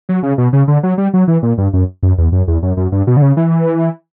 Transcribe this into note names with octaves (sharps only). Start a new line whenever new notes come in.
F#3
C#3
B2
C#3
D3
F#3
G3
F#3
E3
A#2
G2
F#2
F#2
E2
F#2
E2
F#2
F#2
G2
B2
D3
C#3
E3